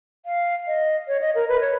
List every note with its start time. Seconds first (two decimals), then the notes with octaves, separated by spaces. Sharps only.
0.26 F5
0.67 D#5
1.08 C#5
1.21 D#5
1.35 A#4
1.49 B4
1.61 C#5